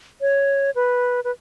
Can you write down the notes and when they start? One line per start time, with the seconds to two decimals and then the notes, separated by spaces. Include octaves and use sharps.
0.21 C#5
0.76 B4
1.24 B4